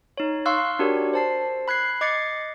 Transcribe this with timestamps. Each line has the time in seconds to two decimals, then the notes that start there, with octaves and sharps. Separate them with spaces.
0.18 D#4 C#5
0.46 F5 C6 C#6 E6 F#6
0.79 D4 F#4 G4 A#4 C#5 D5
1.14 C5 A5 C7
1.68 B5 F#6 G#6 C7
2.01 D#5 D6 G#6 A6 C7 C#7